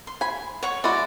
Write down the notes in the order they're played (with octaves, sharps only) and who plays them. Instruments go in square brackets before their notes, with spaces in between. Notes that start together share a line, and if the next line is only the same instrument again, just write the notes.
[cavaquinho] C6
[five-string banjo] G#5 B5
[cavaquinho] C#5 F#5 C#6
[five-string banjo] G#3 E4 F#4 [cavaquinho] D5